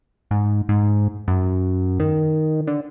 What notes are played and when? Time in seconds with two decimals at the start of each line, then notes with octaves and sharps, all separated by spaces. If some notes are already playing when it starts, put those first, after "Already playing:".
0.31 G#2
0.69 G#2
1.28 F#2
2.00 D#3
2.67 D3